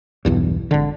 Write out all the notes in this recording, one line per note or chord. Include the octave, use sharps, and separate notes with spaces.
B1 E2 G2
G#1 D3